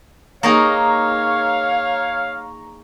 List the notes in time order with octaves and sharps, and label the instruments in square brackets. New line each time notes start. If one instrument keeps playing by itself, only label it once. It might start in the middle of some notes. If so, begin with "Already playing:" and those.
[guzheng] A#3 D#4 G#4 [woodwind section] C#5 [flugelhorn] F5 [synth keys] A#5 C#6